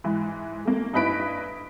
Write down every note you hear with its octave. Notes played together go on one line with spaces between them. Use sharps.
G#2 E3
A3 A#3
G2 D#4 E4 B4 B6 D7